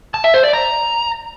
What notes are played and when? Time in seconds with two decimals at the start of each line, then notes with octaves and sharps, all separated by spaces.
0.14 A5
0.24 E5
0.34 C5
0.44 D5
0.54 A#5